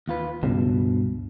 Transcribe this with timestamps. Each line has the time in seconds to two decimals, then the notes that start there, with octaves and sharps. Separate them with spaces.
0.08 D#2 F4 B4
0.43 C#2 G2 B2